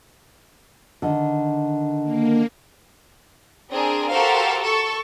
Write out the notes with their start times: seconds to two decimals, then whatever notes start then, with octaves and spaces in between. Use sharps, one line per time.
1.02 D3 D#3
2.03 A#3
3.71 C4 D4 G#4 A#4
4.10 F#4 G4 A4 A#4 C5 F5
4.64 A4 C#6